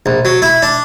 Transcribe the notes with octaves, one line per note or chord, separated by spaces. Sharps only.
A#1
F#3
E4
D4